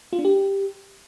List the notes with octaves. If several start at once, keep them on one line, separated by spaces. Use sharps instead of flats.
F4
D4
G4